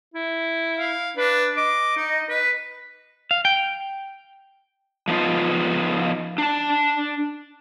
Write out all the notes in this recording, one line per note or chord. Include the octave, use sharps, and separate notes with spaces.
E4
F5
D4 B4
D#5 D6
D#4
B4
F5
G5
F3 F#3 B3 D#4 F4
D4 A5